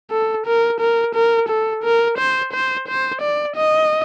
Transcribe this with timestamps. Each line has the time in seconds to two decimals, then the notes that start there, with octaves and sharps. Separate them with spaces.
0.11 A4
0.46 A#4
0.80 A#4
1.15 A#4
1.49 A4
1.83 A#4
2.18 C5
2.53 C5
2.88 C5
3.22 D5
3.56 D#5